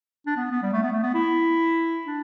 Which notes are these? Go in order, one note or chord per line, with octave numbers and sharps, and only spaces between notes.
D4
B3
B3
G3
A3
B3
A3
B3
E4
D4